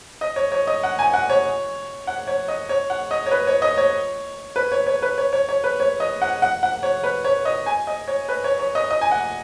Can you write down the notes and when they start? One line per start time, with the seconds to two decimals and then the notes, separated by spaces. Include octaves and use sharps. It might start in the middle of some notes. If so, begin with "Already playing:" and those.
0.21 D#5
0.36 C#5
0.52 C#5
0.67 D#5
0.83 F#5
0.99 G#5
1.14 F#5
1.29 C#5
2.07 F#5
2.27 C#5
2.48 D#5
2.69 C#5
2.90 F#5
3.11 D#5
3.26 C#5
3.31 B4
3.47 C#5
3.62 D#5
3.78 C#5
4.56 B4
4.72 C#5
4.87 C#5
5.02 B4
5.18 C#5
5.33 C#5
5.49 C#5
5.64 B4
5.80 C#5
6.00 D#5
6.22 F#5
6.42 F#5
6.63 F#5
6.83 C#5
7.04 B4
7.25 C#5
7.45 D#5
7.66 G#5
7.87 D#5
8.08 C#5
8.28 B4
8.44 C#5
8.59 C#5
8.75 D#5
8.90 D#5
9.01 G#5
9.11 F#5